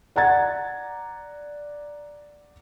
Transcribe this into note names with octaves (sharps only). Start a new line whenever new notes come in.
D5 F#5 A#5 G#6 A6